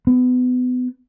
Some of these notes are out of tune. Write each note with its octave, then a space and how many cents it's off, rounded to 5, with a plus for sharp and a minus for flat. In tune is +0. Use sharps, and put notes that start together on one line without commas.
B3 +25